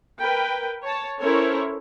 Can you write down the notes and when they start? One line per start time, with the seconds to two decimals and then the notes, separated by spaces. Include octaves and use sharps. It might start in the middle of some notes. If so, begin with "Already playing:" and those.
0.19 A#4 B4 G5
0.84 C#5 A5
1.20 C#4 E4 A4 A#4 C5 C#5